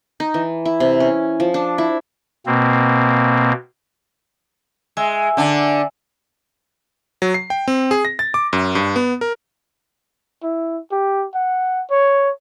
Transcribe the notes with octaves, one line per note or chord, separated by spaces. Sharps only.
D#4
E3
E4
C3
C#4
F3
D4
E4
B2 A#3 C4
G#3 E5 G#5 E6
D3 D4
F#3
C7
G5
C4
G#4
A#6
A6
D6
F#2
G2
B3
A#4
E4
G4
F#5
C#5